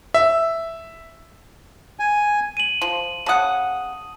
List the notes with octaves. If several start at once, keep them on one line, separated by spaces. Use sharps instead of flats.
E5
G#5
D#7 F#7
F3
C#3 F#5 A5 D#6